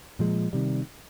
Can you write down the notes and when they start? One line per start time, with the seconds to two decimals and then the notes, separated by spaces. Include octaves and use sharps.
0.19 A#2 F3 G#3
0.53 C3 D#3 G3